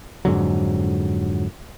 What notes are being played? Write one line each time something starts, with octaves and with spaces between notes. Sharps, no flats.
F2 G#2 D3 F#3